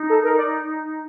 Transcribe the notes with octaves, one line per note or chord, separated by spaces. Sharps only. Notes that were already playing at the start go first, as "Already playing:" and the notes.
Already playing: D#4
A4
A#4
D5